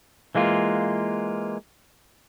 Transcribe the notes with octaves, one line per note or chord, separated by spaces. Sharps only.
E3 G#3 A#3 F4